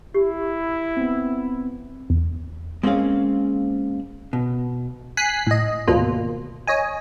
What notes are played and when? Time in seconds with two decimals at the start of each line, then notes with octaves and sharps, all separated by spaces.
0.14 E4 G4
0.97 B3 C4
2.10 E2
2.83 G#3 A#3 C4 C#4 G#4 F5
4.33 B2
5.17 G#5 F#6 B6 C7
5.47 A2 D#5
5.87 G#1 D2 B2 A#3 F4
6.67 C#5 D#5 G#5